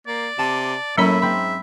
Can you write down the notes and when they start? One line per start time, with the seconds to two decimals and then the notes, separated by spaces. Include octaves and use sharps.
0.07 A#3 D5
0.39 C3 A5
0.98 A2 F#3 A#3 C#4 C#5 E5 B5
1.22 G#2 C4 B5